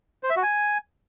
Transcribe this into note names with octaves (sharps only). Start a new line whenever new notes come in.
C5
E5
F#4
G#5